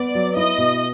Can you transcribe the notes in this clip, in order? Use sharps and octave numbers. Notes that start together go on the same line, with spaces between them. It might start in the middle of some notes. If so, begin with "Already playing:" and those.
Already playing: B3 D5
F#3
E4 D#5
B2